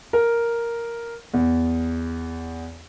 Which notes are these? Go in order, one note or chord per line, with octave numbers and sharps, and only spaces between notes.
A#4
E2